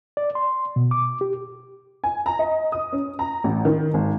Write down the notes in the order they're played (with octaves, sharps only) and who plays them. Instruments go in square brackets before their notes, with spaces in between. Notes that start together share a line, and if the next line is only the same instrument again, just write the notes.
[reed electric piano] D5
C6
B2
D6
G4
[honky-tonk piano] G#5
A#5
D#5
D#6
C#4
A#5
A1
D#3
G#1